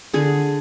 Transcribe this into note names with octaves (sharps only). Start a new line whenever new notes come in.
D3 G#4